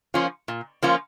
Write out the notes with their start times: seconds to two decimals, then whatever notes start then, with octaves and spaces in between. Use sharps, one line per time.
0.14 F3 A#3 C#4 F4
0.48 A#2
0.82 F3 A#3 C#4 F4